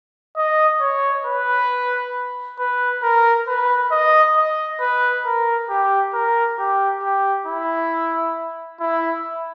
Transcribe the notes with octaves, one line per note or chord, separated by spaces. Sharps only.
D#5
C#5
B4
B4
A#4
B4
D#5
D#5
B4
A#4
G4
A#4
G4
G4
E4
E4